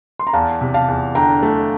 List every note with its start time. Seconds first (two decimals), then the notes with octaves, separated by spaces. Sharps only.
0.19 C6
0.27 A#5
0.33 E2 F5 A5
0.61 C3
0.74 F5 A5
0.88 E2
1.15 D3 G5 A#5
1.43 A3